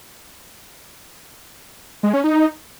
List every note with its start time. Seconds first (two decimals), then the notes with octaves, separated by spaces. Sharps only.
2.03 G#3
2.14 C#4
2.24 D#4